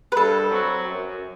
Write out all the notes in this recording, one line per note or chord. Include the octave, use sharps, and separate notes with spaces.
B4
G2 A4
F#3 C4 F#4
F#2